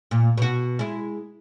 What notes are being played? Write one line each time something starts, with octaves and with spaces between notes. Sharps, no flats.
A#2
B2 F#4
G#3 E4